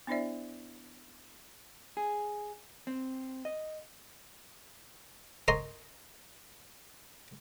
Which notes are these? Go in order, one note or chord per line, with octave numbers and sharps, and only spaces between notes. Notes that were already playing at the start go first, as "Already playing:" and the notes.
B3 D4 E4 C5 D5 E5
G#4
C4
D#5
A#4 C#5 D#5 G#5 C6